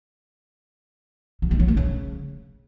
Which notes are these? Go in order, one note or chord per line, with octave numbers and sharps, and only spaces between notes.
F#3
A3
F#3
A3
C#3